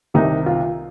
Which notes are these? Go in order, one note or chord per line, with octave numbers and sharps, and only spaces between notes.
C2 C3 D#3 D#4
F4